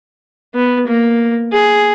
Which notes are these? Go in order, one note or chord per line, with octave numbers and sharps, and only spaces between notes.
B3
A#3
G#4